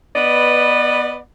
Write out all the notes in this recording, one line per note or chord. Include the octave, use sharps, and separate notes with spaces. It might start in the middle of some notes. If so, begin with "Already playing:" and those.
B3 B4 D5 D#5